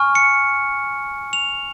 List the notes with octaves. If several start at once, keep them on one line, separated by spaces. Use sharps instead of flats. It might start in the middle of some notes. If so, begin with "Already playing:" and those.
Already playing: G#5 C#6 F6
C#7
F7